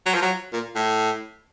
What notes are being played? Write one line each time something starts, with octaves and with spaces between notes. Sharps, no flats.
F#3
F3
F#3
A#2
A2